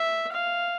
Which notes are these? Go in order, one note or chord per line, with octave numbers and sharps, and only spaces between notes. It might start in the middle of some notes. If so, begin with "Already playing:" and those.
Already playing: E5
F5